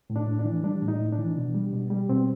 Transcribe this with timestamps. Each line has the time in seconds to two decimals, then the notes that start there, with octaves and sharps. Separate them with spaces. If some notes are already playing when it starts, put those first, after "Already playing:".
0.10 A2
0.16 D4
0.27 A2
0.39 D4
0.45 E3
0.63 G3 D4
0.82 A2
0.88 D#4
1.00 A2
1.12 D4
1.18 E3
1.37 B2
1.54 G3
1.73 B2
1.90 G3
2.09 B2 C4